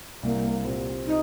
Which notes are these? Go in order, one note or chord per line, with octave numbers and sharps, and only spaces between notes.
C2 A#3
A#2 G3 C4
D#4